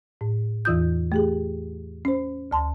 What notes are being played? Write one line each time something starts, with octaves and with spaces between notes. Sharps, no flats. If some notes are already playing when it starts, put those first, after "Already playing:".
A2
E2 E3 F4 D#6 G6
A3 G4 G#4
C#4 C5
D2 A5 C6